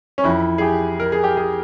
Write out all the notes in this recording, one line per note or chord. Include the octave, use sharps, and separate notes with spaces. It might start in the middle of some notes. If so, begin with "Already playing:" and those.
C#4
F2 E3 E4
G#4
G4
A#4
G#4
G4
G#4